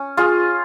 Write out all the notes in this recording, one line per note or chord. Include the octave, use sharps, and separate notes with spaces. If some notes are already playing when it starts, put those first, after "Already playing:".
Already playing: C#4
F4 G#4